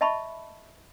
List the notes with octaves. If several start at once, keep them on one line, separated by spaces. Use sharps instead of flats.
D#5 E5 A5 B5 C#6